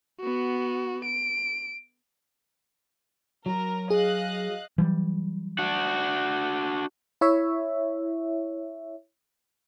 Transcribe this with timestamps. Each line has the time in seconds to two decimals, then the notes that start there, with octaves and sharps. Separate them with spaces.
0.20 B3 F#4
1.05 D7
3.46 F#3 A#4
3.90 G#4 D#5 F5 F#6
4.78 E3 F#3 G3
5.59 D4 F#4
7.21 E4 C#5 E5